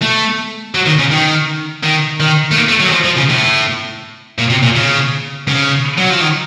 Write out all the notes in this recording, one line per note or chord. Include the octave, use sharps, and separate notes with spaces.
A3
F#3
D#3
C#3
D#3
D#3
D#3
A3
A#3
A3
F#3
D#3
F3
F3
C#3
A2
A#2
C3
A#2
C#3
C#3
F#3
F3
D#3